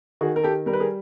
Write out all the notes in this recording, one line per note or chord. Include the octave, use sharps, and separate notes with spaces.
D#3 F#4 G#4
A#4
G4 A4
G3 A#4
B4
G#4 A#4